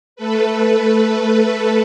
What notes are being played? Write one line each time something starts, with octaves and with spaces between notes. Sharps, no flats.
A3 A4 B4